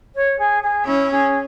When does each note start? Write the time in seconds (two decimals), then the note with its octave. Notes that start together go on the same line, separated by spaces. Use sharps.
0.14 C#5
0.38 G#4
0.62 G#4
0.85 C#4 E4
1.10 G#4